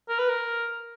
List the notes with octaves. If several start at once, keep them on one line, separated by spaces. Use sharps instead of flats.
A#4
B4
A#4